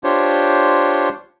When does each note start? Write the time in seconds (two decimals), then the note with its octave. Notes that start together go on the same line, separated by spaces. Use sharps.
0.04 D4 F4 G4 C5 C#5